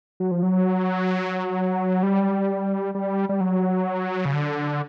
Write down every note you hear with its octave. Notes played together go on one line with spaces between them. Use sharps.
F#3
F3
F#3
G3
G3
G3
F#3
C#3
D3